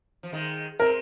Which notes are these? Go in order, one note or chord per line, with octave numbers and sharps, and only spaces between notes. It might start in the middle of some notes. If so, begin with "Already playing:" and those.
F3
D#3 G#3
G#3 C4 A#4